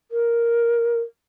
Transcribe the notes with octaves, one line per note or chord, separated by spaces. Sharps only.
A#4